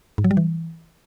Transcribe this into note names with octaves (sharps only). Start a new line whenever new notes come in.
G#2
F#3
G3
E3